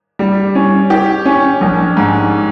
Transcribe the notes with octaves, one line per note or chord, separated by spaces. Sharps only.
G3
C#4
G4
C#4
A#1
G#2